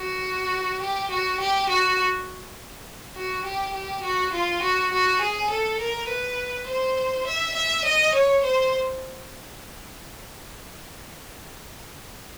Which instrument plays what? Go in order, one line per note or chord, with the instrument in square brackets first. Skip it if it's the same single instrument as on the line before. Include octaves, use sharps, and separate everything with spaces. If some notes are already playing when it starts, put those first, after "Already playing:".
Already playing: [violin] F#4
G4
F#4
G4
F#4
F#4
G4
G4
F#4
F4
F#4
F#4
G#4
A4
A#4
B4
C5
E5
E5
D#5
C#5
C5